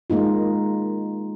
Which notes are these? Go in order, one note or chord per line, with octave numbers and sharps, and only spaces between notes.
G#3 A#3 D#4 F4